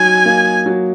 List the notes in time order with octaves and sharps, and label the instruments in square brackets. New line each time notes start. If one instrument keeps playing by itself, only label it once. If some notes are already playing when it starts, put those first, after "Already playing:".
Already playing: [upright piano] F#3 D#4 [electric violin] G#5
[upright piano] A#3
F#3